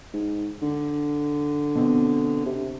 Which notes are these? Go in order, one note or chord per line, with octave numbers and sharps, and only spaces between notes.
G#2
D3
B2 C4
C3